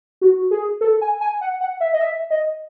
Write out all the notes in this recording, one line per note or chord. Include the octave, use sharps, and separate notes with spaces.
F#4
G#4
A4
G#5
G#5
F#5
F#5
E5
D#5
E5
D#5